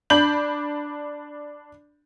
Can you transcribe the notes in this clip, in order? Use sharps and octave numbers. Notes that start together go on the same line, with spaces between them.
D4 B5 G6 F#7